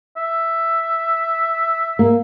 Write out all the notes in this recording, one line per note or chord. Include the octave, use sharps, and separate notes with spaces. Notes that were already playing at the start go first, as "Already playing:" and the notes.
E5
A#3